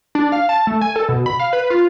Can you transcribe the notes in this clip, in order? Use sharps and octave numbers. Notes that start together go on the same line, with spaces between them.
D4
F5
A5
A3
G#5
A4
B2
B5
F5
B4
F4